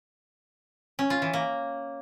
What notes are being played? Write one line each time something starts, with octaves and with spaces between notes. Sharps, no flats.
C#4
F4
E3
A#3